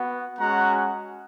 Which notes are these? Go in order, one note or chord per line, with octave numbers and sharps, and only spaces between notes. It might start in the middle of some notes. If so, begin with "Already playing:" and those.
Already playing: B3 F#4
G#3 C#4 F#4 F#5 A#5